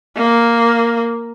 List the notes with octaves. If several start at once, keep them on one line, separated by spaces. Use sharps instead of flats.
A#3